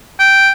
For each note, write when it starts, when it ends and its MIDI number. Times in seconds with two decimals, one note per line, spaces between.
0.19 0.52 79